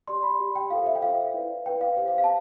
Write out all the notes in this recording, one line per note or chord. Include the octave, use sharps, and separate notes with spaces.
G4 D5 C6
B5
G4 D5
G5
F4 A4 C5 F5
E5
G5
F4 A4 C5 F5
E4 B4 D5
E4 B4 D5 G5
F5
G4 C5 F5
F5
F5
A5